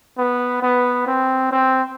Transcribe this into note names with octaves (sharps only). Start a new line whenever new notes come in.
B3
B3
C4
C4